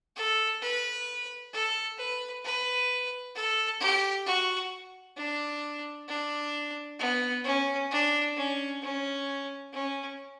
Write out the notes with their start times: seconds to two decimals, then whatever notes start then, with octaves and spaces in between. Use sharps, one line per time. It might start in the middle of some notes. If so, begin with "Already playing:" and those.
0.16 A4
0.63 B4
1.53 A4
1.98 B4
2.44 B4
3.36 A4
3.80 G4
4.26 F#4
5.17 D4
6.08 D4
6.99 B3
7.44 C#4
7.91 D4
8.36 C#4
8.82 C#4
9.72 C#4